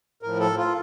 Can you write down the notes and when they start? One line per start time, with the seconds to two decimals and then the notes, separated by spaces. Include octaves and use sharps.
0.22 A2 F3 A#4
0.40 A4
0.58 F4